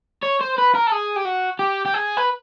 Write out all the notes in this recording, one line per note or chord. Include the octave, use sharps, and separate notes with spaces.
C#5
C5
B4
A#4
A4
G#4
G4
F#4
G4
G4
G#4
B4